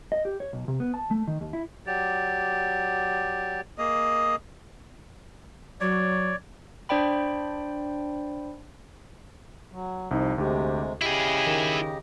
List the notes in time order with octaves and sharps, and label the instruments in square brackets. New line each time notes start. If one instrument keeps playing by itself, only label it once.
[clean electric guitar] D#5
G4
C#5
B1
C3
B3
A5
A3
D#3
D#2
E4
[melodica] F#3 G4 D5
A#3 G#4 D#5
[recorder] F#3 [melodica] C#5 D5
[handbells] D4 C5 D5 G5 B5
[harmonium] F#3
[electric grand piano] C2 D#4 [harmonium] F3
[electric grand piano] D2 G4 [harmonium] C3 G#3
[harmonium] C#3 G4 D#5 [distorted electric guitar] E4 G#4 [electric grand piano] D7
[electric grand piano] D#3